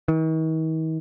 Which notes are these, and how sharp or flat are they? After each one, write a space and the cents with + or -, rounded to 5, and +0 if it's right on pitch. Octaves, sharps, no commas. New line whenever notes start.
D#3 +45